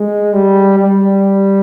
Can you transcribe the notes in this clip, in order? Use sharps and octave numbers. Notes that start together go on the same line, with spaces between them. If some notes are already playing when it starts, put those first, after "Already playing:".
Already playing: G#3
G3
G3